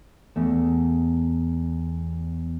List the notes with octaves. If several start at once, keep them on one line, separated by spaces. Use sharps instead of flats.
E2 A3